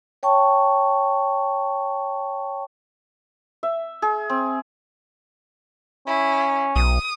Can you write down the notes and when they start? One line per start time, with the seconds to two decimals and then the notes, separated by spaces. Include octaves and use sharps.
0.23 C#5 G5 A5 C#6
3.63 E5
4.02 G#4
4.30 C4
6.07 C#4 E4
6.76 B1 D#6